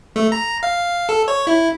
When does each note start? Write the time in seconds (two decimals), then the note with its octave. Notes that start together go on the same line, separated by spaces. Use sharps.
0.16 A3
0.32 A#5
0.63 F5
1.09 A4
1.28 C#5
1.47 E4